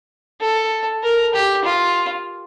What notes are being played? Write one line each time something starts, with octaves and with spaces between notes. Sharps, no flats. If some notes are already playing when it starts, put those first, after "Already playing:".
A4
A#4
G4
F4